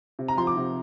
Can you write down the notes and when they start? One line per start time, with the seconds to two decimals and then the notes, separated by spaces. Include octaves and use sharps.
0.19 C3
0.28 A#5
0.37 F3 C6
0.47 D6
0.57 C3